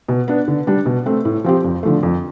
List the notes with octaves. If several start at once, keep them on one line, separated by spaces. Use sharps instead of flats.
B2
B3 D4
D3
G3 D4
B2
A3 C4
A2
F3 C4 G4
F2
D3 F3 A3
F2